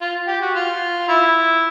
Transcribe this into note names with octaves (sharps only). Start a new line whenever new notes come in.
F4
G4
F#4
F4
E4